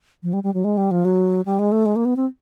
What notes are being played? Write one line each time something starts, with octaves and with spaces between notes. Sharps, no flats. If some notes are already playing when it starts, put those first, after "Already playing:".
F3
G3
G3
F#3
G#3
G3
F3
F#3
G3
G#3
A3
G#3
A#3
B3
C4